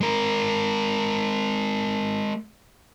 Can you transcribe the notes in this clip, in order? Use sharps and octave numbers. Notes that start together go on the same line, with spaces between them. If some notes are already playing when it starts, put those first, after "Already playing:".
G#3 A#4